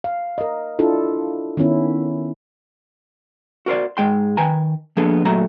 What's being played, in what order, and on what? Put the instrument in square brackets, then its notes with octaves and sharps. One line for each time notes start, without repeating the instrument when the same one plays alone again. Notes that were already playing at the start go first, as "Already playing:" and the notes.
[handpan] F5
A#4 D#5
D4 E4 F4 A4
D#3 B3 C#4 E4
[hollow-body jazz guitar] F#4 A#4 C5 D5
G#2 G#3 G5 C6
D#3 B4 G5 G#5 A#5
F3 A#3 B3 D4 G#4 A4
A#2 F#3 A3 A#5